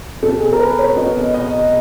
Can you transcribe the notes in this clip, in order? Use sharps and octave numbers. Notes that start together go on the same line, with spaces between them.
B2 A4
G#4
A4
A#4
B4
C#5
B2 D#5
D#5